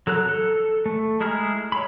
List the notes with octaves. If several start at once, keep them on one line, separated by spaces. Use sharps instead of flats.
F#3 A4 A#5 F#6
A4
A3
G#3 E4 G#4 A#5 F6
C#5 B5